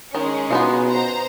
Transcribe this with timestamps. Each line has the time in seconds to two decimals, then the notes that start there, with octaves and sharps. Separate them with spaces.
0.15 D#3 G#3 C#4
0.51 B2 B3 D#4 F4
0.89 C5 A#5